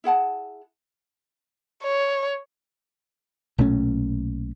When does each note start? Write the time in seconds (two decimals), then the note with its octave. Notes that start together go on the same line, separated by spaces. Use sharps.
0.04 E4 G#4 F#5 A5
1.83 C#5
3.58 B1 A#2 A3 C#4